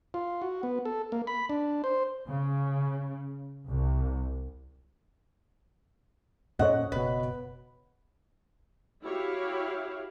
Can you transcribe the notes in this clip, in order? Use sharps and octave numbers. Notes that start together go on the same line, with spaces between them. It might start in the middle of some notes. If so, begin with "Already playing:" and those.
F4
F#4
B3
A4
A#3
B5
D4
C5
C#3
C2
F#2 A#2 C#4 C#5 D#5 F#5
F#1 B2 B4
E4 F#4 G4 C#5 F5